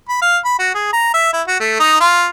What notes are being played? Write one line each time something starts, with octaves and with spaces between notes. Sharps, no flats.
B5
F5
B5
F#4
G#4
A#5
E5
E4
F#4
A3
D#4
F4